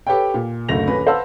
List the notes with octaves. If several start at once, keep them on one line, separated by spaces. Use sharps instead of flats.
G4 A4 B4 C#5 G5
A#2
F#1 D2 A3 A#6 F7
D#1 C#4 B4
B4 C5 F5 F#5 A5 E6